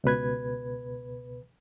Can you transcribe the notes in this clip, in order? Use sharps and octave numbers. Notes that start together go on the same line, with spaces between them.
C#2 B2 B4 G#6